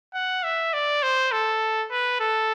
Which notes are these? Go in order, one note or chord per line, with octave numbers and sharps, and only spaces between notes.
F#5
E5
D5
C5
A4
B4
A4